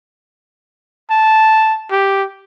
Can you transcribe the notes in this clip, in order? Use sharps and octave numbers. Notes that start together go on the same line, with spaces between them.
A5
G4